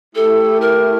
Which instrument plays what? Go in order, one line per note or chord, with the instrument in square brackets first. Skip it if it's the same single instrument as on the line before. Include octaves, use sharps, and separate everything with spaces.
[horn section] A3 E4 G4 [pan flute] A4
[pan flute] A#4